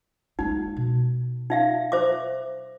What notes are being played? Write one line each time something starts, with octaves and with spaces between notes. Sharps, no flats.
G#3 A#3 D#4
B2
D#4 E5 F5
C5 E5 D6